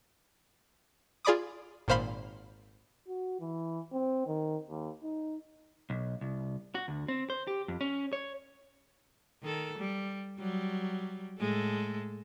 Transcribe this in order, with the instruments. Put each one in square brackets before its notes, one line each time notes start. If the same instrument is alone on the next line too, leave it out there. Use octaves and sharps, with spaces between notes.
[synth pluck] F4 G#4 D5 B5 D6 D#6
G#1 A#2 C5 F5 B5 C6
[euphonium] F#4
E3
C4
D#3
D#2
D#4
[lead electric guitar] B1
C2
F#4
D2
C4
C5
G4
F2
C#4
C#5
[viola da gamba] D#3 A4
G3
F#3 G3
A2 G#3 A4